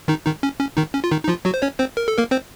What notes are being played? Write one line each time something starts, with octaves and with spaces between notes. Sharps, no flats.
D#3 D#4
D#3 D#4
C#4
C#4
D#3 D#4
C#4
F4
D#3 D#4
D#4
F3 F4
F#3 F#4
C5
C#4 C#5
C4 C5
A#4
A4
A#3 A#4
C4 C5